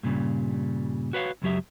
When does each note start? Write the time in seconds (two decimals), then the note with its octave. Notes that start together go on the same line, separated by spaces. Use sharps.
0.03 G2 A#2 C#3 G3
1.13 F#4 B4 C#5 F5
1.42 C#2 F#2 F#3 G4 E5